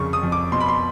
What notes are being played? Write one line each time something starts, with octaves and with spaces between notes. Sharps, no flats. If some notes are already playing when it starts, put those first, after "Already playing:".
Already playing: F2 C#3 C#6
D#6
F2
D6
B2 C6
B5
C6